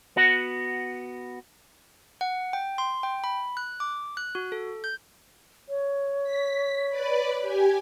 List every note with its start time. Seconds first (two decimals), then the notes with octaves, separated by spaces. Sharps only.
0.16 B3 F#4 F#5
2.21 F#5
2.53 G5
2.78 C6
3.03 G5
3.24 B5
3.57 F#6
3.80 D6
4.17 F#6
4.35 F#4
4.52 A4
4.84 G6
5.69 C#5
6.24 B6
6.89 B4 D5 B5
7.42 G4 G#5